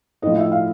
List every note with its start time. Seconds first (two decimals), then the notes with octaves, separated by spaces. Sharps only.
0.22 A2 F3 D#5
0.37 E5
0.52 F5